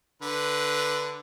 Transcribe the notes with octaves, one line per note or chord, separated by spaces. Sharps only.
D3 B4